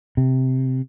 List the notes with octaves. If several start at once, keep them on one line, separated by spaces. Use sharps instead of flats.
C3